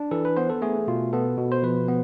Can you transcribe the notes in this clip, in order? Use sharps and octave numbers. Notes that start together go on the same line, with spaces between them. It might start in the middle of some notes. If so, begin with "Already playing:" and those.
Already playing: D4
E3 A4
B4
B3 C5
A4
A3 G#4
B2 F4
B3 A4
B2
C5
F3 B4
B3